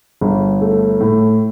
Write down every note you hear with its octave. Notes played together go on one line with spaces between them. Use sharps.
G1
A3
A2